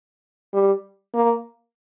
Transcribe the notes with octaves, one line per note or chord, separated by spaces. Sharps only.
G3
A#3